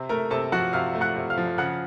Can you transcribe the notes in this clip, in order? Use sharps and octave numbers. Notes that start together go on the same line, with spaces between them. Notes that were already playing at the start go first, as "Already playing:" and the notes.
Already playing: C3
A3 A#4 A#5
C3 A4 A5
F3 F#4 F#5
C3 F5 F6
A3
F#5 F#6
C3
F5 F6
F3
C#3 F#5 F#6